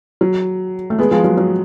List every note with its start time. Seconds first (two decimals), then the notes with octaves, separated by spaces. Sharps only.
0.21 F#3
0.90 A3
0.99 G#3 B3
1.11 F3 G#3
1.24 F#3
1.37 F#3